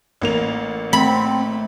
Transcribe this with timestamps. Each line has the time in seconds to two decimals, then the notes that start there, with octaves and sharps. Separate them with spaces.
0.22 A1 A#3 F7
0.93 A3 C4 B5